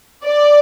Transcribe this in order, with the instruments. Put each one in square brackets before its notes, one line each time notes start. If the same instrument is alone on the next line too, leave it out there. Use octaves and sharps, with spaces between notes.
[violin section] D5